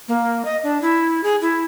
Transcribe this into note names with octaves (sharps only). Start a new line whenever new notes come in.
A#3
D#5
D4
E4
G#4
E4